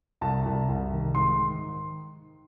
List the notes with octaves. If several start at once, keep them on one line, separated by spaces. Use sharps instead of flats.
C2 A5
C2
C2
D#3
G#2 C6
D#3